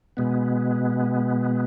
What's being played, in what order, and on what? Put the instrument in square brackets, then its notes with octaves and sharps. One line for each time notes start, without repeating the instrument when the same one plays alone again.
[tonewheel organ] B2 G#3 B3